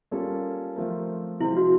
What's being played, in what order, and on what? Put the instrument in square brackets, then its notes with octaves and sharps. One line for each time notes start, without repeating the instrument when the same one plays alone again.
[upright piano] G3 A#3 C#4 F4 A4
F3 A3 C4 F4 A#4
[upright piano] C3 F3 G#3 C4 [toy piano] E4
[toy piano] F#4